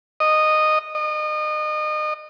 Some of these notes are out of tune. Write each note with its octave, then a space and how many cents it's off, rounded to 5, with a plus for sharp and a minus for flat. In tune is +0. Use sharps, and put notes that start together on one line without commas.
D#5 -10
D#5 -30